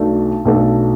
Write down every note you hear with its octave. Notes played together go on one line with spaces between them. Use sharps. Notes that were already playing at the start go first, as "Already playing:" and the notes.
Already playing: B1 B2 A3 D4
B1 B2 A3 D4 A4